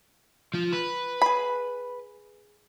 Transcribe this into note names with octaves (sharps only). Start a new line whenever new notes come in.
F3 F4
B4
G#4 B5